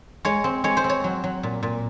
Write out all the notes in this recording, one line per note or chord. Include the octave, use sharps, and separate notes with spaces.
G#3 C#5
C4
G#3 C#5
C5
C4
C#5
F#3
F#3
A#2
A#2